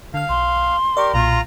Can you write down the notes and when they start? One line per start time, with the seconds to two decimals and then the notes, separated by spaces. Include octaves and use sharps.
0.14 D3 F5 F6
0.29 B1 C6
0.97 G4 A#4 D5 C#6
1.14 B1 A#2 F4 A#5